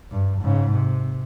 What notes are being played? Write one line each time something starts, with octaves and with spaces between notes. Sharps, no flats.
G2
G#2 C#3
C3